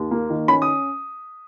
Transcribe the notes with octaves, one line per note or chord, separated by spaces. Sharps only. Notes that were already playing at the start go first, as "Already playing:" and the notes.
Already playing: D#2
A#3
D#3
C#4 B5
D#6